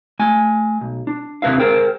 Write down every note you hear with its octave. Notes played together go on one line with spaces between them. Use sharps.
A3 G#5
B1
D4
D#2 C3 D4 B4 E5 F5
G#4 A#4 C5 G5